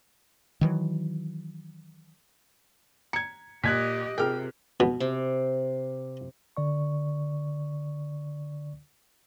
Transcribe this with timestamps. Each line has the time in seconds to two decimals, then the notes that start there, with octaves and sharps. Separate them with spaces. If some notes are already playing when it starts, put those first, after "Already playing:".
0.61 D#3 E3 F#3
3.13 A#5 G#6 C#7
3.64 A#2 G4 D#5 F#6 G#6 B6
4.18 C3 F4 G#4 A#4 G5 F6
4.80 B2
5.00 C3
6.57 D3 D5 C#6